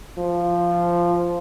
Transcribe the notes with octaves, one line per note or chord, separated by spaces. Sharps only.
F3